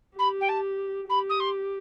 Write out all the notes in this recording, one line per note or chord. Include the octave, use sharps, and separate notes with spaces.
G4 B5
G5
A5
G4 B5
D#6
C6